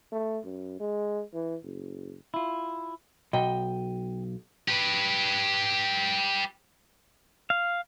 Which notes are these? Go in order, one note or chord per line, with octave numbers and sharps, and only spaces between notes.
A3
F#2
G#3
E3
F#1
E4 F4
B1 D#5 G5
G4 B4
F5